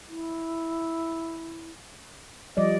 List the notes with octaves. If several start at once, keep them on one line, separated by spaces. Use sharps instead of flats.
E4
F3 G3 D5 D#5